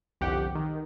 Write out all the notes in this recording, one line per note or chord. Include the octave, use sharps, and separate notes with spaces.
G1 C2 F2 G4 F#5
D#3